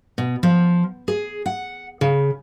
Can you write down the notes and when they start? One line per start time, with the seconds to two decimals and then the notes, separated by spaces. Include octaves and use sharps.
0.18 B2
0.43 F3
1.08 G#4
1.46 F#5
2.01 C#3